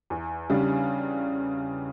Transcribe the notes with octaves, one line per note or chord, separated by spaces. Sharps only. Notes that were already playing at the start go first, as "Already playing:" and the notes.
E2
C#3 G3 D4